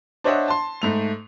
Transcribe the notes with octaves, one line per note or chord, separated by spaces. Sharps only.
D4 C5 C#5 D#5 E5 F#5
A5 C6
G#2 A3 F7